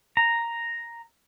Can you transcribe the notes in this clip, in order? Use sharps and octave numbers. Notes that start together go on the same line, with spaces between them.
A#5